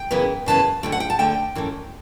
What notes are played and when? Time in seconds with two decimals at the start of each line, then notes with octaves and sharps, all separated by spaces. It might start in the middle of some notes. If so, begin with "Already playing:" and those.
Already playing: G5
0.11 F#2 C#3 E3 B3
0.46 F#2 C#3 E3 B3 A5
0.83 D2 D3 A3 G5
0.92 F#5
1.00 G5
1.10 A5
1.19 D2 D3 A3 G5
1.55 F#2 E3 A3